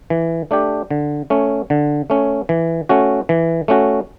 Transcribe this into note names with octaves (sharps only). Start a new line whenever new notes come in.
E3
A3 D4 G4
D3
A3 C#4
D3
A3 C#4
E3
A3 C#4 F#4
E3
A3 C#4 F#4